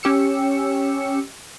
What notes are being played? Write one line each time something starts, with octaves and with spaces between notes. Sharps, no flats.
C#4 G4 E6 C#7